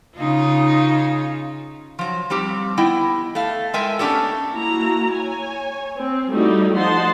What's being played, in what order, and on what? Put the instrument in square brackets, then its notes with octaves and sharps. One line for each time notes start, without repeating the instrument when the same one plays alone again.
[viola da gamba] C#3 D#4 F4
[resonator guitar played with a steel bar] F3 F#3
F3 G3 C4 G4
B3 E4 D#5 G5
A3 F5
G#3 A4 A#4 E5 G5 G#5
A3 B3 C#4 D4 G4 A4
[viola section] A#3 E4 F#4 A#5
C#5 G#5
C4
G3 A3 D#4 E4 F#4 G4
F3 D#4 D#5 F#5 A5 C6